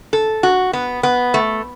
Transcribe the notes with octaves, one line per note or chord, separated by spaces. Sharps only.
A4
F#4
B3
B3
A3